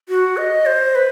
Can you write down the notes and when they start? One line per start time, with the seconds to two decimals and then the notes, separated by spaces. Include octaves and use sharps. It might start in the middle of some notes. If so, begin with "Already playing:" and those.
0.09 F#4
0.37 D#5
0.66 C5
0.95 B4